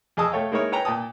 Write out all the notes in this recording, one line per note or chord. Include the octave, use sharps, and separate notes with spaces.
F2 G#4 D#5 A5 D#6 E6
A3 C#5 F5 G5
G#3 A#3 D#4 E4 A#4 C#5
B4 C#5 G5 G#5 A#5
A#2 G5 A5 D#6